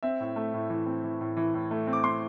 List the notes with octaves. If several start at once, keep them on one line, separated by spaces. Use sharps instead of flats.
C4 E5
A2
A3
A2
E3
C4
E3
A2
E3
A2
A3
C4
D6
C4 C6